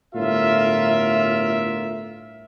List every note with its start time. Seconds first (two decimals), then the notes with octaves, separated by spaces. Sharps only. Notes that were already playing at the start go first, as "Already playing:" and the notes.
0.15 G1 A2 F4 A#4 E5